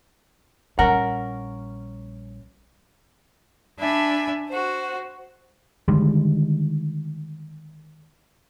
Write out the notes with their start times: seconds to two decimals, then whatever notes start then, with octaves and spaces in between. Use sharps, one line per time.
0.79 A#1 G3 C#4 A#4 F#5
3.78 D4 E5 G#5 B5
4.50 F#4 C5
5.88 D3 D#3 G3 G#3